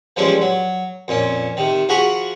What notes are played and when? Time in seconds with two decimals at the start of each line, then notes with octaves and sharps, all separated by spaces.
0.16 E3 F3 G3 G#3 C#4 E4
0.41 F#3
1.08 F2 A#2 C#4
1.57 C3 D#3
1.89 F3 F#4 G#4 A#5 B5 C#6